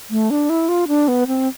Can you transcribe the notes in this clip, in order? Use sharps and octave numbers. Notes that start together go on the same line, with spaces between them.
A3
D4
E4
F4
D4
B3
C4